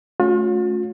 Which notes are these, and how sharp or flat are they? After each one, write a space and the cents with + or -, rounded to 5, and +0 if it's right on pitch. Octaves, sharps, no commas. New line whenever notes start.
A3 -25 C#4 +5 F4 +45